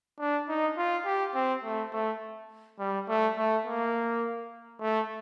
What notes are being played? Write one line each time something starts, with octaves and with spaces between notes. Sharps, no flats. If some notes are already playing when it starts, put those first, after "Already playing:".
D4
D#4
F4
G4
C4
A3
A3
G3
A3
A3
A#3
A3